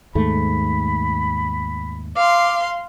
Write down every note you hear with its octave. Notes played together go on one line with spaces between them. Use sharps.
D#2 G#2 A3 B5
F5 C6 D6